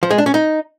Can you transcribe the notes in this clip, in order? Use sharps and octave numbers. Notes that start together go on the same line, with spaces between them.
F3
G#3
D4
C#4
D#4